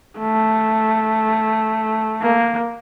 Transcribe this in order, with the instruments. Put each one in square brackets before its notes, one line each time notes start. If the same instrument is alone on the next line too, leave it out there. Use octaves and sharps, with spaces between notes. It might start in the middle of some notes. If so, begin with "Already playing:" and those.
[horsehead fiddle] A3
A#3